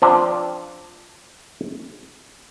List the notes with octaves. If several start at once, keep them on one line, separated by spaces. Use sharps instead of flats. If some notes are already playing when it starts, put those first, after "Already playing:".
F3 C4 D4